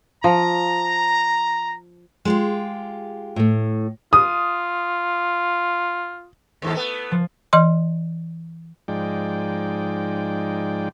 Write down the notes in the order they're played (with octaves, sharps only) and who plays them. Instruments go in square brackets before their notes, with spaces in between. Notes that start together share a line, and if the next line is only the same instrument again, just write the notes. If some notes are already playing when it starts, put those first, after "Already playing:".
[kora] F3 [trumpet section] A#5
[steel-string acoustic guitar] G#3 F4 G4
[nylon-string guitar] A2 A3
[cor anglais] F4 [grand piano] D#6
[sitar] D#2 G#2 A4
A3 B3
[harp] F3
[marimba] E3 D#5 C6
[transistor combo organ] G#2 F3 G#3 D#4 D5 G5